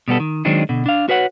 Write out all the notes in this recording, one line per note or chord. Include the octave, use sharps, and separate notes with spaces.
B2 G3 B3 A4
D#3
D#3 F#3 G#3 C4 D4 D#4
B2 D3
D4 F5
F#4 B4 C#5 F#5